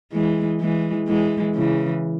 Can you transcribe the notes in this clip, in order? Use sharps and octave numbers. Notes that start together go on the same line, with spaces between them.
E3 G#3
E3 G#3
E3 G#3
C#3 E3